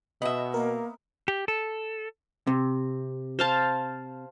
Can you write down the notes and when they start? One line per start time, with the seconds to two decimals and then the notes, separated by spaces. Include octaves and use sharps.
0.22 B2 B3 D#5 E5
0.54 A#3 A#4
1.28 G4
1.48 A4
2.47 C3
3.39 C5 F5 A5